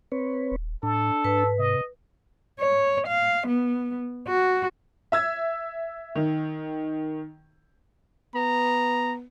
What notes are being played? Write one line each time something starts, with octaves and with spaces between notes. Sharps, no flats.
C4 B4 C#5
D#1
A2 D4 A4
G#2 B4
C3 D#5
C#5
F5
B3
F#4
E5 E6 G#6
D#3
B3 A#5